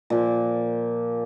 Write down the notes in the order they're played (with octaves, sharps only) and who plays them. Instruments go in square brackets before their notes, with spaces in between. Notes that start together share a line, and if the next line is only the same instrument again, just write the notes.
[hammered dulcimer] A#2 F3